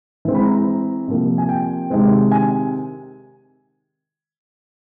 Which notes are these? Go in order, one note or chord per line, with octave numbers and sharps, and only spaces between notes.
E3 G#3 C4
B5
A#5
C3 F3 A#3
G#5
G5
C3 D#3 G#3 C4
G#5